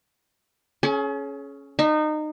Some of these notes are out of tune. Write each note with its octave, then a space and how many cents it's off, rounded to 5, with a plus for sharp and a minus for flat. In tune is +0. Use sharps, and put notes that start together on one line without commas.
C#4 +0 G#4 +40
D#4 -25 E5 +0